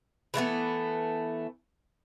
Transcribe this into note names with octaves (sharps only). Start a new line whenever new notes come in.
E3 G#3 A3 B3